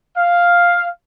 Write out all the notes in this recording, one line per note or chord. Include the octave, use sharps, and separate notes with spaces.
F5